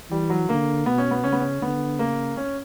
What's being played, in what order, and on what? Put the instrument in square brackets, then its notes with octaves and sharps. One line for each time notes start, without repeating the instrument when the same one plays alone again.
[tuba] E3 [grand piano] G3
[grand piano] F#3
[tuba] D3 [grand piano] A#3
[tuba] B2 [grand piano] B3
[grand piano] C#4
B3
[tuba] C#3 [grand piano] C#4
[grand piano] B3
C#4
[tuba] D3 [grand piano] B3
[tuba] C#3 [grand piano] A#3
[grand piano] C#4